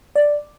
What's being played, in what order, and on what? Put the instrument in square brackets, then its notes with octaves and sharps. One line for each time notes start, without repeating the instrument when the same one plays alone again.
[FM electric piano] D5